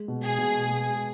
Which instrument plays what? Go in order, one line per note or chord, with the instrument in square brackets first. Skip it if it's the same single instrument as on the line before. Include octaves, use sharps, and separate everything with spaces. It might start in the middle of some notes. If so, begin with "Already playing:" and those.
Already playing: [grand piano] G#3
B2
[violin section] G#4
[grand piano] B2
G#3